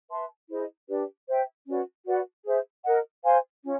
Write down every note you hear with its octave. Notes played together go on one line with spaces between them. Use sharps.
B4 E5 A5 C6
E4 G#4 C5 D#5
D4 G4 B4 D5
C5 E5 G5
C#4 F#4 B4 D5
F#4 B4 D5 F#5
G#4 C5 E5
A#4 D#5 F#5
C5 F5 G#5 C6
C#4 F4